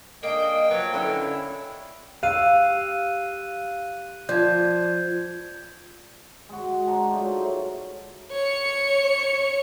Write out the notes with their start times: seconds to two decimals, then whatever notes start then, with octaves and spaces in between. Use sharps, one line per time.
0.23 G#3 A#3 D4 D#5 G5
0.70 F3 F#3 B3 F#4
0.93 D3 C#4 E4 C#5 F5
2.23 G4 F5 E6 F#6 D#7
4.29 F3 D5 G6 G#6
6.49 G#3 F#4
6.88 D4 C5 A5 A#5
7.13 F#3 A3 D#4 F4
8.32 C#5 C#7